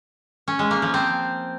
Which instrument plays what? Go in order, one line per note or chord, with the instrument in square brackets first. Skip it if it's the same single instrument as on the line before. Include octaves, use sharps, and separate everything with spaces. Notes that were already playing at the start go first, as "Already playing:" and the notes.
[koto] C#4
G#3
A#3
F3
C4